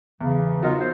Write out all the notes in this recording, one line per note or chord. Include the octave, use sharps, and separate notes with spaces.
E2 C#3 E3
F#3 B3 D#4 F4 A#4
C5